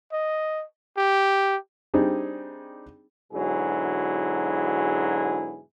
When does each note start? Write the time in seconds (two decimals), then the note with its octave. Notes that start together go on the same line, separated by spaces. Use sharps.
0.12 D#5
0.97 G4
1.94 G3 C4 D4 D#4 G#4
3.33 G#2 B2 D3 F#3 E4 G#4